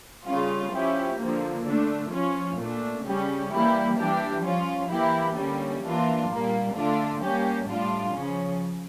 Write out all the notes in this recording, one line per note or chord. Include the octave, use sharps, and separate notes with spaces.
C#3 G3 C#4 F4
F3 C#4 E4 G4
D3 F3 A#3
D3 A3 D4
F3 C#4 F4
A#2 A3 D4
C#3 G3 C#4 G4
E3 G3 A#3 E4 G4
E3 G3 D4 G4
F3 C#4 F4
E3 A#3 E4 G4
D3 G3 A#3 C#4
E3 A#3 D4 F4
A#2 G3 A#3
D3 A3 D4 F4
G3 A#3 C#4 G4
A2 G3 D4 F4
C#3 F3 C#4